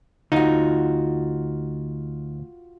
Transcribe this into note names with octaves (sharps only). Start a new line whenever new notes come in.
D2 D#4 F4 F#4